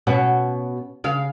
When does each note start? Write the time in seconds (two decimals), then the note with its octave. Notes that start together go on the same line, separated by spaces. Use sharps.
0.07 B2 C#4 F#4
1.04 C#3 F5